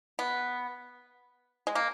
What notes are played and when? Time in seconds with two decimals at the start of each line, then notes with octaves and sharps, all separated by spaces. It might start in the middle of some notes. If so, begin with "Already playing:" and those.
0.19 B3
1.67 G#3
1.75 A#3